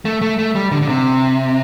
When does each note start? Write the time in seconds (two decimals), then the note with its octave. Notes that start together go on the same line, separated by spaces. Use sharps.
0.05 A3
0.21 A3
0.39 A3
0.55 G3
0.71 D3
0.82 D3
0.88 C3